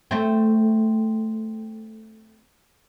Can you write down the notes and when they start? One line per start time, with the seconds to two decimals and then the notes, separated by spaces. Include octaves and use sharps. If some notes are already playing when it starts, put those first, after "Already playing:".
0.11 A3 C4